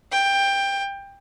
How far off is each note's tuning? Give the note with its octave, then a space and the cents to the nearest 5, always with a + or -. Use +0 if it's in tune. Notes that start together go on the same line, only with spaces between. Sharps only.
G5 +15